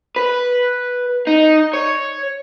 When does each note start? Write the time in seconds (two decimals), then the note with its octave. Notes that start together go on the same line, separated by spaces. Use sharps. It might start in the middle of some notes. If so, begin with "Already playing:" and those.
0.16 B4
1.27 D#4
1.74 C#5